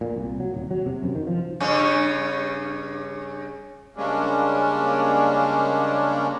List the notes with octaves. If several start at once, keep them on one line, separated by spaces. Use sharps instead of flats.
A#2
C2
F#3
D#1
F#3
C3
F#2
D#3
F3
G2 C#3 C#4
C#3 G3 G#3 A#3 C#4 D4